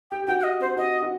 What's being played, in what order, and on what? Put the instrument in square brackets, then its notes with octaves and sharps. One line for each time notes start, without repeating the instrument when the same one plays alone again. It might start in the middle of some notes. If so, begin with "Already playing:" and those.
[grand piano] G4 [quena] G5
[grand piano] G4
[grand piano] F#4 [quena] G5
[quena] F#5
D#5
[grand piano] C4 [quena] C5
[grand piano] F#4 [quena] D#5
[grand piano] F#4